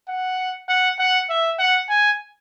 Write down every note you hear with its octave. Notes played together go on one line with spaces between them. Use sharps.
F#5
F#5
F#5
E5
F#5
G#5